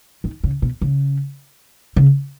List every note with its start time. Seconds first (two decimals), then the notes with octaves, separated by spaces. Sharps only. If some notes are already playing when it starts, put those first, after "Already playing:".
0.24 D#3
0.44 C#3
0.62 B2
0.82 C#3
1.96 C#3